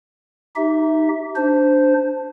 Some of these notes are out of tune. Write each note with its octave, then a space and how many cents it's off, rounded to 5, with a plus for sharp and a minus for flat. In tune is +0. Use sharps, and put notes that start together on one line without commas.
D#4 +0 G4 -25 E5 -10
D4 +0 C5 -10